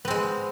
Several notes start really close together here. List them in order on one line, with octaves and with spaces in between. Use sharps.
B3 C4 G#3